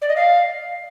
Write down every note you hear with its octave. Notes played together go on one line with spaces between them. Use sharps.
D5
D#5
F5